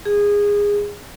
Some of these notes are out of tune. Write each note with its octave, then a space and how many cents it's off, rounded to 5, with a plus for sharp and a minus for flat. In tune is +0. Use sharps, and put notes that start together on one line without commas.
G#4 -20